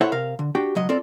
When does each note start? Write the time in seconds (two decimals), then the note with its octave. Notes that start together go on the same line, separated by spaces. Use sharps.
0.01 E4 A4 C5 C#5 E5 F#5
0.12 C3 A#4 F5
0.39 D3
0.55 D4 F#4 G4 G5
0.75 C#2 F#3 D#5
0.89 C4 F4 A4 D5